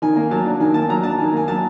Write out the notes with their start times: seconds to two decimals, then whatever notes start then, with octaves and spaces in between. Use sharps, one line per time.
0.02 D#3 G#5
0.16 A#3
0.31 F#3 A5
0.45 D4
0.60 D#3 G#5
0.74 A#3 A5
0.89 F#3 A#5
1.03 D4 A5
1.18 D#3 G#5
1.33 A#3 G#5
1.48 F#3 A5